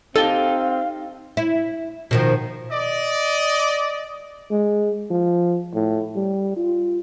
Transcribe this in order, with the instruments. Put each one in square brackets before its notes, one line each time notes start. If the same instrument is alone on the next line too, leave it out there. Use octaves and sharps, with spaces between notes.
[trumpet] C4 [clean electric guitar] D#4 G4 [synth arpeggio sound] A4 [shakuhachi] F5
[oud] E4
B2 D#3 F3
[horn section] D5 D#5
[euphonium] G#3
F3
A2
G3
F4